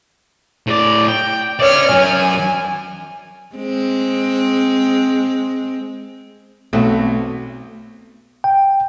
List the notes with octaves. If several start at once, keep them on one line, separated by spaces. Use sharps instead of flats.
A2 D5
G5
C#5 D5 E5 F6
F#2 F#3 G#5
G#3 C4
B1 A3 C4 F#4
G5